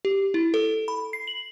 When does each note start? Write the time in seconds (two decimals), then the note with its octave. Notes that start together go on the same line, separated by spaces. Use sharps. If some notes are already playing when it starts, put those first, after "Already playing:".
0.05 G4
0.34 E4
0.54 A4
0.88 B5
1.13 C7
1.28 F#7